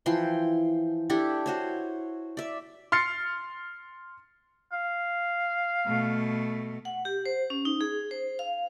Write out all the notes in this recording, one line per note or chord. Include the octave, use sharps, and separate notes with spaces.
E3 F3 G5 C6
D4 E4 G4 A4
F#4 C5 C#5
D5 E5
C6 F6 A6 C7 C#7
F5
B2 A3
F#5
G4
C5
C#4
D#4
G#4
C5
F5